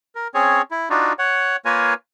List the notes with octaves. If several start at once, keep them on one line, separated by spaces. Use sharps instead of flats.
A#4
C4 C#4 G#4 C#5
E4
D4 D#4 F4 F#4
C#5 F#5
A#3 F4 A#4 B4 C#5 G#5